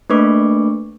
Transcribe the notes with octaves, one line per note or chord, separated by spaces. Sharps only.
A3 A#3 D4 B4 C#6 D6